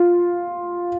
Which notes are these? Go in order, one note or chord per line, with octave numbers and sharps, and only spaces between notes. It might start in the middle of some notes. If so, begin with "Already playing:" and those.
Already playing: F4